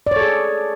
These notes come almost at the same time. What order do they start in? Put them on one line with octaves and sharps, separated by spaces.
D5 C#5 A4 G#4